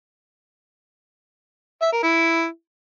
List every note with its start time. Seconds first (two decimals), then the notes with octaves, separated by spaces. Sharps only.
1.82 E5
1.93 A#4
2.03 E4